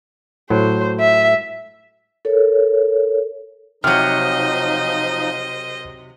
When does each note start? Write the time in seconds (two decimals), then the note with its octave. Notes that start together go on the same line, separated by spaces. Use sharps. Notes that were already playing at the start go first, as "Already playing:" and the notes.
0.50 A2 F#3 C5
1.00 E5
2.25 A4 A#4 C#5
3.84 C3 F3 F#3 D#4 C5 D#5 F6 G6